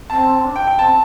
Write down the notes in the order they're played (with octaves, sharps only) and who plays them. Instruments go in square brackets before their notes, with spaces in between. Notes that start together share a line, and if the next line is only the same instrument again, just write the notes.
[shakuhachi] C4 [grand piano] A5
[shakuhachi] D4
[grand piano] G5
[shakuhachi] E4
[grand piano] G5
[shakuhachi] C4 [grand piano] A5